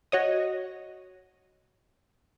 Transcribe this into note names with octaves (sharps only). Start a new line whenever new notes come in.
F#4 C#5 D#5